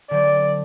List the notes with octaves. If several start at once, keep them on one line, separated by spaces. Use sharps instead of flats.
D3 F#3 C4 D5